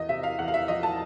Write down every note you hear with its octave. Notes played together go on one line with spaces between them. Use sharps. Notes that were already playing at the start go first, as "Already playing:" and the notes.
Already playing: E2 D#5
C3 E5
F5
E2 F#5
F5
E5
F3 D#5
A5